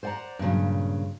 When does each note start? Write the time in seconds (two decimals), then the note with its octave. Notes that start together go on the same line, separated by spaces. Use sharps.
0.03 C5 D5 F#5 G#5 A#5
0.39 G2 A#2 C#3 F#3